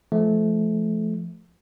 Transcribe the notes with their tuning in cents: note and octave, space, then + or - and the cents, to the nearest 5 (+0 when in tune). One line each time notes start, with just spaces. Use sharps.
F3 -25 A3 -25